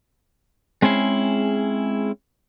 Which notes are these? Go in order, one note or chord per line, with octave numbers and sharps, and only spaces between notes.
G#3 C4 C#4 E4 G#4